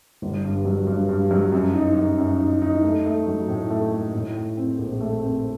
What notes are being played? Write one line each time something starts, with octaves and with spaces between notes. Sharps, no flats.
G1
G2
F#3
G2
G2
F#3
F#2
D#4
F#2
F#2
D#4
D#4
A3
A3
F#3
A2
A3
A3
A2
A2
C4
A#1
A3
C4